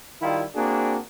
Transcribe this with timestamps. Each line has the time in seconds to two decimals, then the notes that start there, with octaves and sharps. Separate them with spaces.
0.21 D#3 G3 E4 F4
0.54 A#3 C4 D4 F#4 G#4